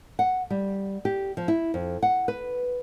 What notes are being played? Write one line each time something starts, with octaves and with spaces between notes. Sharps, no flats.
F#5
G3
G4
F3
E4
F2
F#5
B4